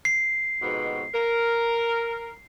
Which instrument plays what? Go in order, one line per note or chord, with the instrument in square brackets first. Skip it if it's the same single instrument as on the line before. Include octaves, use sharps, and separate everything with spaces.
[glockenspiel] C7
[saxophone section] F2 G#2 B2
A#4